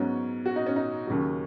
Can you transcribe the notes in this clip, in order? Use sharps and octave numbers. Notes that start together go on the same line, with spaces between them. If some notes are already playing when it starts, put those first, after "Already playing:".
Already playing: G#2 F#3 B3 C#4
F#4
D#4
C#4
D#4
D#2 C#3 F#3